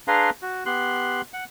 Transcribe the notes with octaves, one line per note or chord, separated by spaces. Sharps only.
D4 G#4 B4 F5 A#5 C6
F#4
B3 G4 C6 F#6
F#5